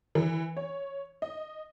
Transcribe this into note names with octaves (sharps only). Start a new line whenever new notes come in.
E3
C#5
D#5